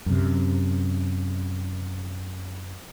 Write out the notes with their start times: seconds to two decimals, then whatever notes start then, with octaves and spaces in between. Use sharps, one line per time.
0.06 F#2 C3